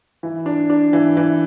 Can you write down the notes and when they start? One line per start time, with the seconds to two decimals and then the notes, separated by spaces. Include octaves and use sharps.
0.23 E3
0.46 D4
0.70 D4
0.93 E3
1.17 E3